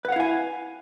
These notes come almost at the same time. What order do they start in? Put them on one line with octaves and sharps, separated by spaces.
B4 F#5 F5 E4 G#5